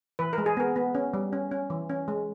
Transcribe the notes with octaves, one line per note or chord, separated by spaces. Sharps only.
E3 B4
G#3 A#4
G#4
B3 A#4
B3
C#4
G3
C#4
C#4
E3
C#4
G#3